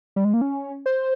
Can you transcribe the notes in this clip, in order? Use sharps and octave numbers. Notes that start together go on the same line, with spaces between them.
G3
G#3
A#3
C#4
C5